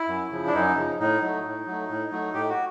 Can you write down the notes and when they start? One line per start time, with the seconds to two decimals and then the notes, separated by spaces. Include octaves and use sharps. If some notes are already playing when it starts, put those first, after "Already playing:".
Already playing: E4
0.08 F#2
0.31 C#3 F3
0.47 D4
0.54 F#2 D#4
0.77 C#3 F3
0.99 A2 D#4
1.22 F#3 A3
1.45 A2
1.67 F#3 A3
1.90 A2
2.12 F#3 A3
2.34 A2 G4
2.49 F#4